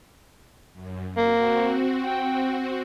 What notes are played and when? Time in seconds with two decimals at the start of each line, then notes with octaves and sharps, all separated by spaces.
0.73 F#2
1.17 A#3 C4 F#4
2.06 G5